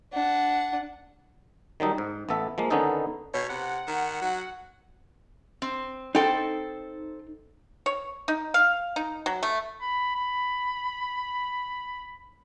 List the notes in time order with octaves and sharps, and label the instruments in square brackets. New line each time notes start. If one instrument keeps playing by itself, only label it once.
[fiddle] D4 F#5
[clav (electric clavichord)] D#3 F#3 G3 D#4 A4
G#2
A1 B3 A4 E5
F3 G#3 A#3
D3 D#3 B3 C#4 D#4 A4
[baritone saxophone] B2 [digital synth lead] C#5
[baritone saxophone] C3 [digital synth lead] F#5
[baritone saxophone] D#3
F#3
[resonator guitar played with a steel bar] C4
[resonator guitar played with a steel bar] C4 A4 [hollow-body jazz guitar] D#4 G5
[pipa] C#5
D#4
F5
D#4
F#3
A3
[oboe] B5
B5